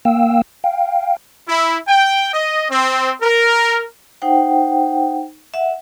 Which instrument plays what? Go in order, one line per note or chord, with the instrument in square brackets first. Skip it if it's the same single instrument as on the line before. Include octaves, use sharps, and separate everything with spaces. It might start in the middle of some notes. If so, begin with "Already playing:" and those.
[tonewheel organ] A#3 F5 G5 E6
F5 G5
[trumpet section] E4
G5
D#5
C4
A#4
[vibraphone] D#4 C5 F#5 G5
E5 F#5